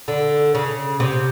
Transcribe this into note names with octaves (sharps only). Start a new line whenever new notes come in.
D3
C#3
C3